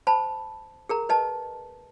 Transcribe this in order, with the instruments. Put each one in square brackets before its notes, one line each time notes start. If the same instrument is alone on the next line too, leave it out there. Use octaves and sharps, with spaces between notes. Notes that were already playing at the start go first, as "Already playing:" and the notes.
[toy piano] C5 A5 B5
G#4 A#4 A#5
B4 D#5 A5